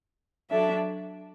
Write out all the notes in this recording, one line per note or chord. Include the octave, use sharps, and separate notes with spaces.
F#3 D4 A4 E5